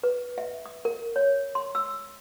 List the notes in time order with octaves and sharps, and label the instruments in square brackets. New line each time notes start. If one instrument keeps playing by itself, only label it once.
[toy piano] B4
E5
D#6
A#4
C#5
C6
E6